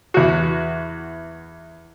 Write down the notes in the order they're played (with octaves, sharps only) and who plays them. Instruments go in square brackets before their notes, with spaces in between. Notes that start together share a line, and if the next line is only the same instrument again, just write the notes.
[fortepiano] E2 F#4